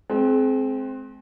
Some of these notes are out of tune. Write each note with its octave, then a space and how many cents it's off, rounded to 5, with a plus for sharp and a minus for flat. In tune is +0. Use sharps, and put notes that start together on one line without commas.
G#3 +35 C4 +0